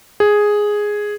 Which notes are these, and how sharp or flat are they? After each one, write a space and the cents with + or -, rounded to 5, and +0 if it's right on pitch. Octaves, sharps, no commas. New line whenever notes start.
G#4 +0